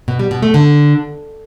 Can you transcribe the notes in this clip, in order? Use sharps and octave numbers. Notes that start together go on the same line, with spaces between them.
B2
G3
B2
A3
D3